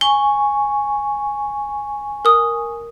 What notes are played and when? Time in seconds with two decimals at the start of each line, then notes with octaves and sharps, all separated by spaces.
0.01 G#5 C#6 G7
2.25 A#4 D#6